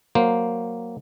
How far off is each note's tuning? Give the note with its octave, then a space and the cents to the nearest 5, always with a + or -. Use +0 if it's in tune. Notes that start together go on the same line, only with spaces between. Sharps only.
F#3 +0 A#3 +0 C5 +0